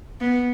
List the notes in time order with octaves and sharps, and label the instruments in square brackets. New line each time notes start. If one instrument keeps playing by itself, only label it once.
[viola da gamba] B3